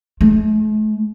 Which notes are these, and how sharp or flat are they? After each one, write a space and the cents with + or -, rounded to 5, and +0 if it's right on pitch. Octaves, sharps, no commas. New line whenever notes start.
A3 -45